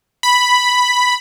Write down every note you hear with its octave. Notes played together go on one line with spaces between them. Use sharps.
B5